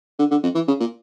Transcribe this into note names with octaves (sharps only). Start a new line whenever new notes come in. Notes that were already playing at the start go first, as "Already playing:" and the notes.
D3
D3
F2
E3
C#3
A#2